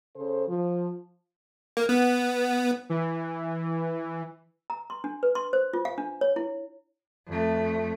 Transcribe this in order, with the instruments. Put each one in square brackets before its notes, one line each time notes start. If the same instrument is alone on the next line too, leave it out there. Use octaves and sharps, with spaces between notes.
[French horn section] C#3 A4 C5
F3
[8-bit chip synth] A#3
B3
[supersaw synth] E3
[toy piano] A#5
C6
D4
B4
C6
C5
F4
F5
D4
C#5
E4
[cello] F2 A3